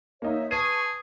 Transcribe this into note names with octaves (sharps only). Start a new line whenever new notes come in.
A#3 D#4 C#5 E5
G#4 B4 A5 C#6 D#7